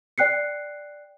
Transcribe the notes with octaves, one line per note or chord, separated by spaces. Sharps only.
D5 G5 F#6 C7 C#7